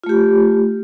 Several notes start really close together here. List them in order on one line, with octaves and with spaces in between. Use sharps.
F4 A3 G4